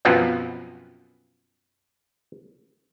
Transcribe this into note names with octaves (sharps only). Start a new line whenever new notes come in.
F#2 B2 F3 B3 C4